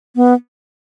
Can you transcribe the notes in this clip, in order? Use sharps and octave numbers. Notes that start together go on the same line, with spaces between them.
B3